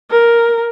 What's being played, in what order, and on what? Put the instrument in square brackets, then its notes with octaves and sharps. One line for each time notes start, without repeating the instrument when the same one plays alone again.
[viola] A#4